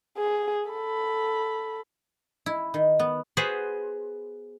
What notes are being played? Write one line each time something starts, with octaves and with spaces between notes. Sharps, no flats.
G#4
A4 B5
E4
D#3
B3
B3 F#4 G#4 B4 C5